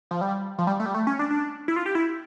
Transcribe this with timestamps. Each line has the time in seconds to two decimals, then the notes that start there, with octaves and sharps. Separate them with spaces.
0.11 F3
0.21 G3
0.58 F3
0.67 G3
0.80 A3
0.86 G3
0.94 A3
1.07 C#4
1.19 D4
1.30 D4
1.68 E4
1.76 F4
1.86 G4
1.95 E4